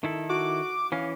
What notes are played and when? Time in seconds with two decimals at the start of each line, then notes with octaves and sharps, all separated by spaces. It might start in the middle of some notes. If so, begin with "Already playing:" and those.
0.04 D#3 E4 A4
0.29 F#4 D6
0.92 E3 C#4 F5